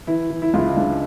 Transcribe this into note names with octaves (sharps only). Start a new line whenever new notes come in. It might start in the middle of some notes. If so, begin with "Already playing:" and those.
E3 E4
E3
E4
C#2 E4 F4
C#2 D4